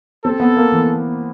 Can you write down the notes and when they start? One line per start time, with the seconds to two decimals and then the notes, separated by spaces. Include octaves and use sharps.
0.24 C4 A4
0.40 B3
0.57 A#3
0.72 E3